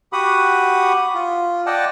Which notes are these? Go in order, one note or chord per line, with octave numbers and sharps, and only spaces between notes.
F#4 G4 F#5 B5 D#6
F4
D5 D#5 F#5 G5 A5